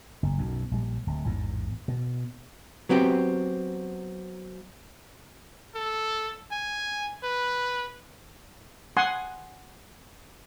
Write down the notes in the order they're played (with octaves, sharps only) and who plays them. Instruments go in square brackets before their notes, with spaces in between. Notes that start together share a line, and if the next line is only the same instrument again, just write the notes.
[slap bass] F#1
B1 F#2
A#1 G3
D1
A1 E2 G#2
B2
[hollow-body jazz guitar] F#3 B3 C4 G4
[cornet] A4
G#5
B4
[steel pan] F#5 G#5 C6 D#6